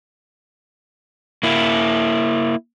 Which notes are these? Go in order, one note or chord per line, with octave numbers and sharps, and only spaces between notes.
A#3 E4